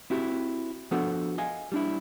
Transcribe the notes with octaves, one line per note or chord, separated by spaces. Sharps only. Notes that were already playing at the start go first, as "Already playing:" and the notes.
C4 E4 F#4 G4
F3 B3 D4 F#4 A4 C5
D#5 F5 G#5
G3 D4 E4